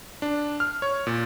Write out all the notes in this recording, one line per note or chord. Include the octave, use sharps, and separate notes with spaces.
D4
F6
C#5
A#2